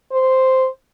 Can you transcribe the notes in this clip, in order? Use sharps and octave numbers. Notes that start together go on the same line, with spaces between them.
C5